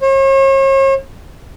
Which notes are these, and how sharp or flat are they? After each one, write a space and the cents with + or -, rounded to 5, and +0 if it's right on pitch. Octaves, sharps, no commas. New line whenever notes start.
C#5 -40